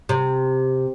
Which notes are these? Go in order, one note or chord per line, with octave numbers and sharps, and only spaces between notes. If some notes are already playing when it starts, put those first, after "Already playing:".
C3